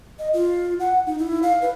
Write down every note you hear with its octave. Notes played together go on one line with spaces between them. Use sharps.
D#5
F4
F#5
D#4
E4
F5
B4